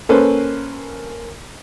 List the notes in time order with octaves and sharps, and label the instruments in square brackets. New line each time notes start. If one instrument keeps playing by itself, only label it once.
[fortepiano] A#3 C#4 A4 B4 C5